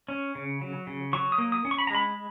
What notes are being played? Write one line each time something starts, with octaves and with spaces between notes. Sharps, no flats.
C#4
C#3
F#3
C#3
F#3 C#6
D#6
A#3
D#6
C#4
C#6
B5
A#5
G#3 B5